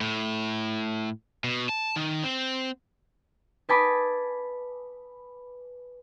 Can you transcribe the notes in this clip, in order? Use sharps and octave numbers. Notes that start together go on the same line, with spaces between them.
A2
B2
A5
D#3
C4
B4 D#5 G#5 A5 B5 D6